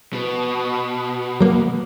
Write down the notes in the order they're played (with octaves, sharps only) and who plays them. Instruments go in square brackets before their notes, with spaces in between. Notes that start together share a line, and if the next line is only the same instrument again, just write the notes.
[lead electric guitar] B2
[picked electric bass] F#3 A#3